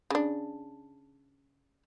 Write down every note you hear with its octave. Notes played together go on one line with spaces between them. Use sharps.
C#3 D4